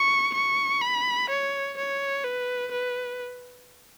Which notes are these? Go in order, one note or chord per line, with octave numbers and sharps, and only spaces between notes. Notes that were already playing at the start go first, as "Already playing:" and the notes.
Already playing: C#6
C#6
B5
C#5
C#5
B4
B4